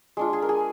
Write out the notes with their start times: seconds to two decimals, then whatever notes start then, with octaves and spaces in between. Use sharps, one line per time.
0.17 G#3 D4 F4
0.33 G#4
0.42 A#4
0.49 G#4